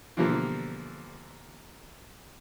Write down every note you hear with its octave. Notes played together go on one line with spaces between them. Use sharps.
B2 D3 E3 F3 G3 A#3